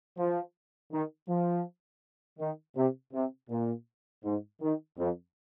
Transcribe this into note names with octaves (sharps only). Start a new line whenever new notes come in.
F3
D#3
F3
D#3
C3
C3
A#2
G#2
D#3
F2